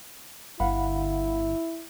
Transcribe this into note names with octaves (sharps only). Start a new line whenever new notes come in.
G1 E4 F5 F#5 B5